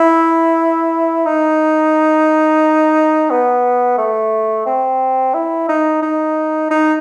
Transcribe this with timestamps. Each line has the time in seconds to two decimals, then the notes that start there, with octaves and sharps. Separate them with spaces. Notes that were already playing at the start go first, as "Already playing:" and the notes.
Already playing: E4
1.26 D#4
3.30 B3
3.98 A3
4.66 C4
5.34 E4
5.69 D#4
6.02 D#4
6.70 D#4